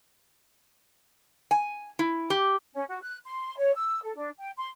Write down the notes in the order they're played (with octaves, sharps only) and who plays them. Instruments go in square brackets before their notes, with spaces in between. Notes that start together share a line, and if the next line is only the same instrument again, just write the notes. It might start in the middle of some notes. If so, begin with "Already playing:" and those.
[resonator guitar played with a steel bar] G#5
E4
G4
[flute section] C#4
F#4
F#6
C6
C#5
E6
A4
D4
G5
C6